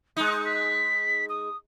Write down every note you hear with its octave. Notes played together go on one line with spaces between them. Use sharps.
G#3 D#4 D#6
B6
D#6